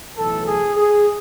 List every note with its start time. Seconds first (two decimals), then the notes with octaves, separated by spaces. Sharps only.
0.17 B1 A2 E3 A4
0.46 G#4
0.76 G#4